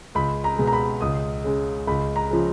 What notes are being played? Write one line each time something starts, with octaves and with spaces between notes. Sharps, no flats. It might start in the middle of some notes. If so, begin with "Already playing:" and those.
C#2 B5
A#5
B2 G#3
A#5
B5
C#2 D#6
C#3 G#3
C#2 B5
A#5
C#3 F3